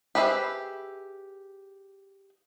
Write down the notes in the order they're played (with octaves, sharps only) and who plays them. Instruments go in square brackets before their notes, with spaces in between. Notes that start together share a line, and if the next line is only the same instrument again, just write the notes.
[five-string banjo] G4 G#4 B4 C5 E5